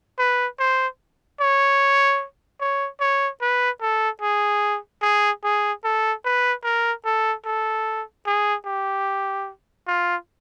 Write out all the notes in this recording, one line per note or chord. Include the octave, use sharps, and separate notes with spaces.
B4
C5
C#5
C#5
C#5
B4
A4
G#4
G#4
G#4
A4
B4
A#4
A4
A4
G#4
G4
F4